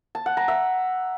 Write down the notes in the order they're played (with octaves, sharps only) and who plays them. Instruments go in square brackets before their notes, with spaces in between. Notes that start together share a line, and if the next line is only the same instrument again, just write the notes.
[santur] A5
F#5
A#5
E5